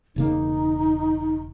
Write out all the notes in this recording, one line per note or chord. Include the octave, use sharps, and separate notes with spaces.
E1 C#3 A#3 D#4